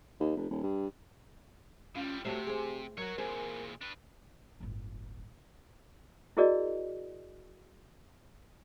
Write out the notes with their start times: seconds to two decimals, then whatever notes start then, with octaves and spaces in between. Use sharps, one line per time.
0.20 D#2
0.36 F1
0.50 D#1
0.63 G2
1.95 A2 G3 C#4 F4
2.25 C3 F#3 A3 C4 G4
2.47 G#4 C5
2.97 F#3 A#4 C#5 F#5
3.18 A#2 E3 C4 G#4
3.81 D4 B4
4.60 D1 G1
6.37 E4 F#4 G#4 A#4 D5 D#5